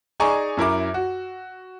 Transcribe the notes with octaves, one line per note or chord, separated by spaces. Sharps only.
D#4 G#4 D5 G#5 A#5 C#6
F#2 E4 A#4 D6
F#4